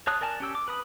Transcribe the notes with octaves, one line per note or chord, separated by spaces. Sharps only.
C#5 A5 D#6 F#6
A#4 D5 G#5 A5
C#4 G4 E6
D6
B4 B5 D#6